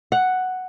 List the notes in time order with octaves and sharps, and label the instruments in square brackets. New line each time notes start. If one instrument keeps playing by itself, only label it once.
[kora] F#5